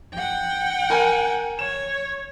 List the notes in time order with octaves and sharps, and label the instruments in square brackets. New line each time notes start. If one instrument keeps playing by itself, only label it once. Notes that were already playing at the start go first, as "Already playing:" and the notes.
[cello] F#5 G5
[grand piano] A#4 G#5
[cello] C#5 [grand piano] E7